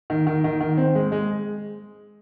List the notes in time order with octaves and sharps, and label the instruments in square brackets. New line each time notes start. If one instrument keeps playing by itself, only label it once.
[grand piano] D#3
D#3
D#3
D#3
C4
G#3
G#3